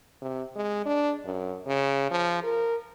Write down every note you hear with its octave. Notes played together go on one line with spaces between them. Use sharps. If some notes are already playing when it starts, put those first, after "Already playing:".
C3
G#3
D4
F#2
C#3
F3
A#4